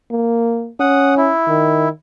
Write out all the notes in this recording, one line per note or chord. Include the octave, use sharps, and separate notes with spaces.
A#3
C#4 F#5 D#6
E4
D#3